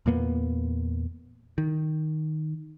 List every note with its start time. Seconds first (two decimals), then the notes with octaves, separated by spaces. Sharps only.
0.06 E2 A#2 A#3 B3
1.58 D#3